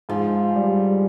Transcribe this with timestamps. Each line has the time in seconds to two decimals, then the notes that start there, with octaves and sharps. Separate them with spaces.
0.09 G#2 F3
0.56 G3